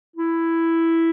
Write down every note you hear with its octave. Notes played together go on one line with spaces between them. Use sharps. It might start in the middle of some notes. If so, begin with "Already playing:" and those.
E4